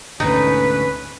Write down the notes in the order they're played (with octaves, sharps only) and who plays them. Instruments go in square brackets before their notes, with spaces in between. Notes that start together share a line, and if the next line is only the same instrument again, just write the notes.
[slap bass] D2 G#2 B2 [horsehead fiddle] C#4 B4 [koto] D#4